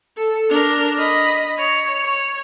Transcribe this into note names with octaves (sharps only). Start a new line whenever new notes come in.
A4
D4 A#4
D#5 B5
C#5
C#5